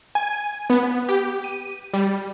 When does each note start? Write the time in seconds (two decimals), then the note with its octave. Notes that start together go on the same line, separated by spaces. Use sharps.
0.15 G#5
0.70 B3
1.09 G4
1.44 D#7
1.94 G3